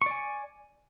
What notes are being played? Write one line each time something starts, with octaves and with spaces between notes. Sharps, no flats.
D5 G#5 C#6